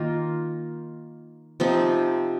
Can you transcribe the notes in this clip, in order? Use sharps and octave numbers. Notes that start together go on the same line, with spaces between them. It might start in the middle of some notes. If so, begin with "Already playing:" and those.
Already playing: D#3 A#3 F4 A#4
C3 F3 C4 D#4